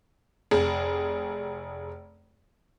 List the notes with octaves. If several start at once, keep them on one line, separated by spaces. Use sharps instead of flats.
F1 G#4